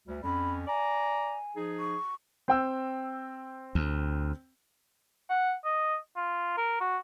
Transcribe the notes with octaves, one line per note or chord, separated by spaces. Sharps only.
D2 G3
F2 C#4 B5
D5 G#5 A#5
F3 D#4 G#4
C#6
C4 G5 E6
D2
F#5
D#5
F4
A#4
F#4